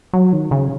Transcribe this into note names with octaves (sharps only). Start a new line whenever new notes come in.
F#3
D#3
C#3